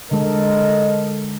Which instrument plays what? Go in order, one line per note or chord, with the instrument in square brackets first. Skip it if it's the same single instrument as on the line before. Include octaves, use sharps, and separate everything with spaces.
[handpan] D3 G#3 [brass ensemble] A4 A#4 D#5